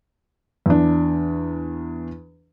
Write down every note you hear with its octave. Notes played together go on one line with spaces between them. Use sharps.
E2 D4